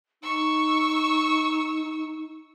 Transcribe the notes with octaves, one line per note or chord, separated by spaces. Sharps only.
D#4 C#6 E6